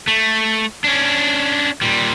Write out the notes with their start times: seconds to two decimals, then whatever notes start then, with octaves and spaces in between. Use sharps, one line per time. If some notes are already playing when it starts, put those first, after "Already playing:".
0.08 A3
0.84 C#4 D4
1.81 A#2 G3